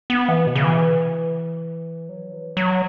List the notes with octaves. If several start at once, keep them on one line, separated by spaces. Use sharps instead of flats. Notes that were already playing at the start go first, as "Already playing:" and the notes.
B3
E3
B2
C#3
E3
F#3
E3
F#3